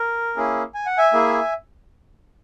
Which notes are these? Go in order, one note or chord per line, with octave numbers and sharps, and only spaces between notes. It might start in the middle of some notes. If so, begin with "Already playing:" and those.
Already playing: A#4
A#3 C#4 E4 G#4
G#5
F#5
E5 G#5
A#3 E4 G#4